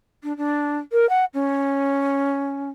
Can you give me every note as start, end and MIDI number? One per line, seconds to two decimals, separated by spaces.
0.23 0.35 62
0.37 0.77 62
0.92 1.07 70
1.09 1.24 78
1.34 2.69 61